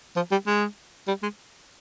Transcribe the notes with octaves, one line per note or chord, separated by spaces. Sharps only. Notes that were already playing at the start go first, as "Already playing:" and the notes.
F3
G3
G#3
G3
G#3